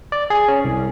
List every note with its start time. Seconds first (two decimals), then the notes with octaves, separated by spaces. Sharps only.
0.12 D5
0.30 G#4
0.48 C#4
0.65 C2